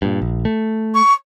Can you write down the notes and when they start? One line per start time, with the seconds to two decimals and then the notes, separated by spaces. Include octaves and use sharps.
0.02 G2 A#2
0.22 A#1
0.45 A3
0.94 C#6